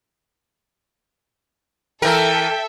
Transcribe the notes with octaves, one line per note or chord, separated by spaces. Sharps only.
E3 A4 A#4 E5 G5